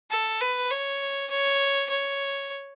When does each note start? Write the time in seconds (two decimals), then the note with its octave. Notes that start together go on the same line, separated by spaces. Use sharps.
0.11 A4
0.41 B4
0.71 C#5
1.30 C#5
1.90 C#5